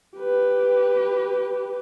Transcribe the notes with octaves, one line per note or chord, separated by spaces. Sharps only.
G4 B4